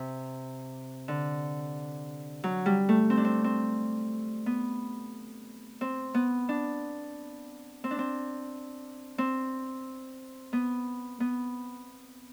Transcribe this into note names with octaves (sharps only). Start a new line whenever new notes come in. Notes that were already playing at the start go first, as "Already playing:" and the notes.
Already playing: C3
D3
F#3
G3
A3
C4
D4
C4
C4
B3
C4
B3
D4
C4
D4
C4
C4
B3
B3